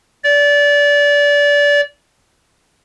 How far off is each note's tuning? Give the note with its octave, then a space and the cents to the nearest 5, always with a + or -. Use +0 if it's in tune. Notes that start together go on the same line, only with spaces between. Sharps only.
D5 -25